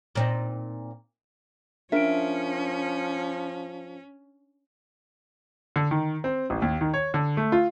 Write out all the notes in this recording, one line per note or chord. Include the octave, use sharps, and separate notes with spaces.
A#2 C4 D#4
F3 C#4 D4 A#4 E5 D7
D3
D#3
C4
A1
D#2
D#3
C#5
D3
A3
F4